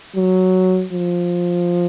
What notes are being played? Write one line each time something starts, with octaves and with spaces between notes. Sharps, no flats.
F#3
F3